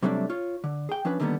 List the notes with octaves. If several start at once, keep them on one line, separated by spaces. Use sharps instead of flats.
C3 F#3 G3 A3 C4 D4
F4 C#5
D3
G#4 G5
F3 C#4 D4 B4
D3 D#3 G3 A#3 B3